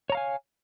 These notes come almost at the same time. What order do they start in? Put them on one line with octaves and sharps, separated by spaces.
C#5 A#5 F5 G#5